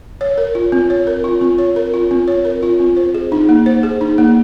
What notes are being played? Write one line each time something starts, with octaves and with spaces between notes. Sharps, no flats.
C#5
A#4
F4
C4
C#5
A#4
F4
C4
C#5
A#4
F4
C4
C#5
A#4
F4
C4
C5
G#4
D#4
A#3
C5
G#4
D#4
A#3